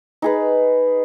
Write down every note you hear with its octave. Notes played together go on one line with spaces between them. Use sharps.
D#4 G#4 B4